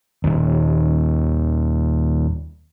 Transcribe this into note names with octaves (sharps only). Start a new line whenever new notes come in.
D#1 D#2